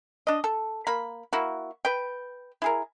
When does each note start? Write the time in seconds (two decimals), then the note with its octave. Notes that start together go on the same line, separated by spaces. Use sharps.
0.27 D4 D#5
0.44 A4
0.87 A#3 B5
1.33 A#3 E4 F#4
1.85 B4 G5
2.62 E4 G#4 A#4